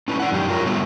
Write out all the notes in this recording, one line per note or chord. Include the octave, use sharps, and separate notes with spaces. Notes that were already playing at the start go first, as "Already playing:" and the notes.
C#4 D4 E4 B4
D5 F#5
F#2 D#3 G4
F4 A#4 C5 C#5
D3 F#3 G3 A3 B3